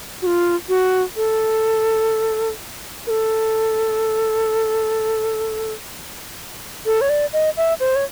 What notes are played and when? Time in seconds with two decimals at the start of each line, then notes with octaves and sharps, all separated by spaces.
0.22 F#4
0.26 F4
0.69 F#4
1.16 A4
3.07 A#4
3.10 A4
6.86 A4
7.01 C#5
7.09 D5
7.33 D#5
7.57 E5
7.80 C5
7.96 C#5